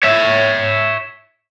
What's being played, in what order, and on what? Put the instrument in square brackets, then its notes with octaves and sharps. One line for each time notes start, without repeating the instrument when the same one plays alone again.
[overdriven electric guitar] C#5 E5